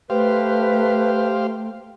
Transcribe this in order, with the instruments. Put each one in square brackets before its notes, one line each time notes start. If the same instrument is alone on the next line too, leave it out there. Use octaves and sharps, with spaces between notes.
[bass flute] A3 [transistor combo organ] G4 C5 F5 [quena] B4